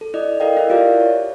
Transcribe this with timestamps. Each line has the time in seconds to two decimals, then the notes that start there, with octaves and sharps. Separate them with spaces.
0.01 A4
0.14 E4 D5 D#5
0.40 A4 A#4 D#5 F5 G5
0.57 E4 E5
0.70 F4 G4 A#4 D5 F5
1.00 C#5